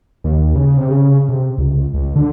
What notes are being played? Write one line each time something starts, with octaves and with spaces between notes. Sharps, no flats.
D#2
C#3
C3
C#3
C3
C#2
C#2
D3